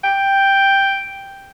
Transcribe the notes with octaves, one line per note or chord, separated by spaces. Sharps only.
G5